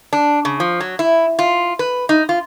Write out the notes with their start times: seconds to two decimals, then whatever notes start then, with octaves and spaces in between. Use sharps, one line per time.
0.13 D4
0.45 C#3
0.60 F3
0.81 F#3
0.99 E4
1.39 F4
1.79 B4
2.09 D#4
2.29 F4